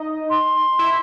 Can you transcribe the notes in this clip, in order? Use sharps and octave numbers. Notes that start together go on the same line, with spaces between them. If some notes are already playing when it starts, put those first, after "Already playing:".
Already playing: D#4 D#5
C6
E4 E5